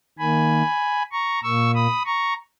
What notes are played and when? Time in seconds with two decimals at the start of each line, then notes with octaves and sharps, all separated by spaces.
0.18 D#3 A#3 G#5 B5
1.12 A#5 C#6
1.43 A#2 A#3 C#6 E6
1.74 B5 D#6
2.05 A#5 C#6